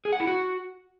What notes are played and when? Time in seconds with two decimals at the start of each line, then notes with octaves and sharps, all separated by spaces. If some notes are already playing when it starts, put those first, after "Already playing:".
0.05 G#4
0.13 F#5
0.20 E4
0.27 F#4